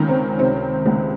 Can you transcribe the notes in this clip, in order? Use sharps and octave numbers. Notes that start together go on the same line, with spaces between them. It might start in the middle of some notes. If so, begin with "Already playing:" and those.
Already playing: C#2 D#3 C#4
C4
C3 C4
C#2